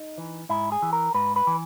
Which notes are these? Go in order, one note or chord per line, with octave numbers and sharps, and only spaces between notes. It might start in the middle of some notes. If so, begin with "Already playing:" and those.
Already playing: D#4
E3
G#2 E4
G#4
E3
A#4
G#2 B4
B4
E3